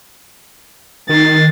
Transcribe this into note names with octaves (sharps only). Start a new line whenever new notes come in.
D#3 A6 C7